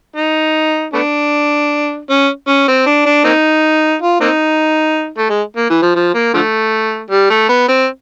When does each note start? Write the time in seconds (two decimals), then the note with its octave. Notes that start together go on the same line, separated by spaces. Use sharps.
0.16 D#4
0.93 A3 B3 D4
2.10 C#4
2.48 C#4
2.68 C4
2.86 D4
3.06 D4
3.24 A#3 C4 D#4
4.02 F4
4.21 A#3 C4 D#4
5.18 A3
5.30 G#3
5.56 A#3
5.70 E3
5.82 F3
5.95 F3
6.14 A#3
6.34 D3 F3 A3
7.10 G3
7.30 A3
7.49 B3
7.68 C4